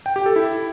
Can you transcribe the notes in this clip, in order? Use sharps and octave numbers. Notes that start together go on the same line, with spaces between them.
G5
G4
A4
E4